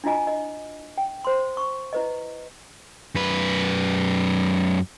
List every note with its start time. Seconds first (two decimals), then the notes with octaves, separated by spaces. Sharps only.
0.04 D4 E4 F4 D#5 G#5
0.27 D#5
0.98 G5
1.25 C5 C6
1.57 C#6
1.93 E4 B4 D#5
3.15 F#2 B4